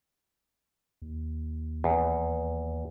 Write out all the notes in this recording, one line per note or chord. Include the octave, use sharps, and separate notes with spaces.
D#2
E2